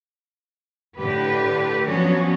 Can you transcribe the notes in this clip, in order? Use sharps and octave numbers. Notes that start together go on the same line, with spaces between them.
A2 D3 G4 B4
F3 F#3 B3 C#4 D4 F#4